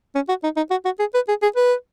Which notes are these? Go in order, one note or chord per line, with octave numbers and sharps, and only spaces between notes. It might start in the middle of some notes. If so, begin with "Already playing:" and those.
C#4
F#4
D#4
D#4
F#4
F#4
G#4
B4
G#4
G#4
B4